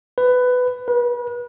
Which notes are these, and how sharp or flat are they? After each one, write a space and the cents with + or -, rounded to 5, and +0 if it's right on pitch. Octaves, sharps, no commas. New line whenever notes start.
B4 +15
B4 -35